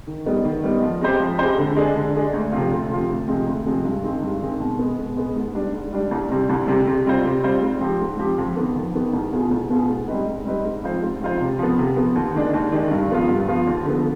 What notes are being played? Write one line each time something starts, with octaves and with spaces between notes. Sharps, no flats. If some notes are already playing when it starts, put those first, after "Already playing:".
D#3
G3 B3 D#4
D#3
G3 B3 D#4
F3
G#3 C4 G4 C5
F3
G#3 C4 G4 C5
D3
G#3 D4 G#4
D3
G#3 D4 G#4
D2
C3 F3 C4 F4
D2
C3 F3 C4 F4
D2
C3 F3 G#3 C4
D2
C3 F3 G#3 C4
G2
D#3 G#3 C4
G2
D#3 G#3 C4
B2
G#3 B3
B2
G#3 B3
G#2
G3 D4
G#2
G3 D4
C2
C3 G3 C4
C2
C3 G3 C4
C3
G3 C4 F4 C5
C3
G3 C4 F4 C5
G#2
F3 C4 G4
G#2
F3 C4 G4
F2
D#3 B3
F2
D#3 B3
C2
B2 B3 F4 G#4
C2
B2 B3 F4 G#4
G#2
G3 C4 D#4 B4
G#2
G3 C4 D#4 B4
G#2
F3 C4 F4 C5
G#2
F3 C4 F4 C5
C3
F3 B3
C3
F3 B3
D#2
D#3 G#3 D4
D#2
D#3 G#3 D4
G2
F3 B3 F4
G2
F3 B3 F4
D#2
D3 F3 B3